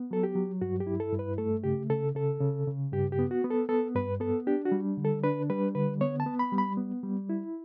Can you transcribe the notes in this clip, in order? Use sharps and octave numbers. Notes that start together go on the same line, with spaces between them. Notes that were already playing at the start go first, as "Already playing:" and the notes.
Already playing: B3
F#3 A4
G4
F#3
G2 F#4
G4
E4
A4
G2
B4
A3 A4
C#3 G4
C#3 A4
C#3 A4
C#3
C#3
G2 G4
G4
B3
F#4
B3
A4
B3 A4
G2 B4
B3 A4
D4 G4
F#4
G3
D3
A4
D4 B4
G3 B4
D3 B4
B3 C#5
A5
B3
B5
G3
B5
B3
G3
E4